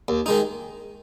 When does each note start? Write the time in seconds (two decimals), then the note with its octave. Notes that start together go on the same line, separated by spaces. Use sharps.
0.08 D#2
0.26 D#3 G#3 D#4